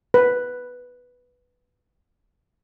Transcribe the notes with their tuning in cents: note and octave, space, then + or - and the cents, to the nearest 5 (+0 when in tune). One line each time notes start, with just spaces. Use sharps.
B4 +0